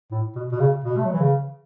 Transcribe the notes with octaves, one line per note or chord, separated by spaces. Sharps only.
A2
B2
B2
C#3
B2
A3
F#3
E3
C#3